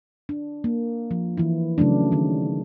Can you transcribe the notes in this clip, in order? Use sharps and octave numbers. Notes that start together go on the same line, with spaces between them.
D4
A#3
F3
E3 E4
C#3 F#3 A3 D4
D#3 D#4